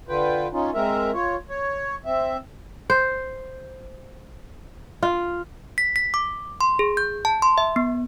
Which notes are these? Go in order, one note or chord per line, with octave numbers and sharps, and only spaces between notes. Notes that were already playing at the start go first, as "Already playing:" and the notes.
D3 F4 B4 G5
C#4 D#4 F4
G#3 C4 A#4 E5
F4 C#5
C#5
C4 E5
C5
F4
B6
B6
D6
C6
G#4
G6
A5
C6
E5
B3